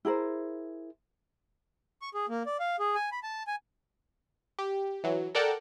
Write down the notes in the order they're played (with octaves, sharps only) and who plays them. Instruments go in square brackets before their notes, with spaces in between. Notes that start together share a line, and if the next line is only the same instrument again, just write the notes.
[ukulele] E4 G#4 A#4 C5
[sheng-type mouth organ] C#6
G#4
A#3
D5
F5
G#4
G#5
B5
A5
G#5
[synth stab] G4
E3 F#3
A4 A#4 D5 F#5 G5 A5